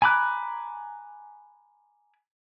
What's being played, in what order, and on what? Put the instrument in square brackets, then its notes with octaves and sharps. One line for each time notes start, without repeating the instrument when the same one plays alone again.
[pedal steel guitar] G#5 A#5 B5 D6 F#6